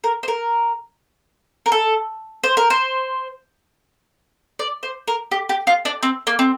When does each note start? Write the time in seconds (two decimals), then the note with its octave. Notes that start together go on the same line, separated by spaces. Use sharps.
0.04 A#4
0.23 C5
0.28 A#4
1.66 A#4
1.72 A4
2.44 C5
2.57 A#4
2.70 C5
4.59 D5
4.83 C5
5.08 A#4
5.31 G4
5.49 G4
5.67 F4
5.85 D4
6.03 C4
6.27 A#3
6.39 C4